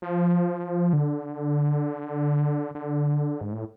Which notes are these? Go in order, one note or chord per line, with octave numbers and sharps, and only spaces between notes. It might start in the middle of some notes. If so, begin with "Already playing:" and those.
F3
D3
D3
G#2
A2